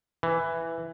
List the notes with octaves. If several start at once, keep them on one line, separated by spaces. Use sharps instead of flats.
E3